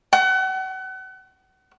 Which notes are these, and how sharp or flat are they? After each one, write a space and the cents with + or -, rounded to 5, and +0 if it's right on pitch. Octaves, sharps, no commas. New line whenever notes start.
F#5 +35